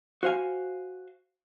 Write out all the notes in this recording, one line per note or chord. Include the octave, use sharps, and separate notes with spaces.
F#4 C5 F5 G#5